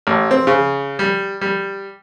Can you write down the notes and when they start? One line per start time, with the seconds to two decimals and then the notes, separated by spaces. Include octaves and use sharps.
0.07 A1
0.31 C4
0.47 C#3
0.99 G3
1.41 G3